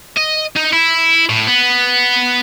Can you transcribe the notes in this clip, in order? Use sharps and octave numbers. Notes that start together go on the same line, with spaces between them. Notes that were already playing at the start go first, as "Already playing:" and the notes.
D#5
D#4
E4
A2
B3